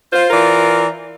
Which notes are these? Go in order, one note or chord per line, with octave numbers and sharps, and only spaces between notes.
F4 C5
E3 F4 A#4 D5